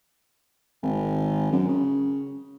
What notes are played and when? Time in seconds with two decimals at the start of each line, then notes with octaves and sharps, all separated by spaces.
0.83 G#1
1.52 F#2
1.69 C#3